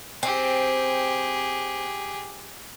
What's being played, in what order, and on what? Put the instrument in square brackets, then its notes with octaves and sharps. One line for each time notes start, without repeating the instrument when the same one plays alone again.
[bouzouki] C4 [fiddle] G4 G#4